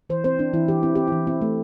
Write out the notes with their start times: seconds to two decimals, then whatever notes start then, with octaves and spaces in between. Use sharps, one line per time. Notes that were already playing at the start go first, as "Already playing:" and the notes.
0.10 E3 C5
0.24 C4 C5
0.39 C4 D4
0.53 E3 E4
0.68 E3 G4
0.83 C4 E4
0.95 C4 G4
1.08 E4
1.12 E3
1.27 C4 E4
1.41 A3